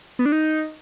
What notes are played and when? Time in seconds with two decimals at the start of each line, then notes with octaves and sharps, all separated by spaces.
0.19 B3
0.26 D4
0.32 D#4